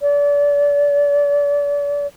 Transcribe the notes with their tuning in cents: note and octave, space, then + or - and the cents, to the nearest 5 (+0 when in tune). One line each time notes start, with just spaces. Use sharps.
D5 -35